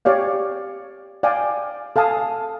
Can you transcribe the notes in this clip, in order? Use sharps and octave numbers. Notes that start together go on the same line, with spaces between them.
G4 C#5 D5 F5
D5 F5 G5 G#5
A4 F5 G#5 A5 D#6